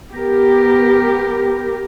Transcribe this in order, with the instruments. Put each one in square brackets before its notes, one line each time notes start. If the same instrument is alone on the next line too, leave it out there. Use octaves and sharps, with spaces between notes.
[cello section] B3 G4 A#4